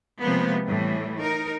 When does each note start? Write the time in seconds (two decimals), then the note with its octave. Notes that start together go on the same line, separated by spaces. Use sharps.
0.22 C3 F3 G#3 A#3 B3
0.66 A2 E3 G3
1.19 D#4 A#4